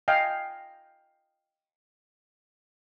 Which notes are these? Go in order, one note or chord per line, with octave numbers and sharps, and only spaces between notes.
D#5 F5 G5 G#5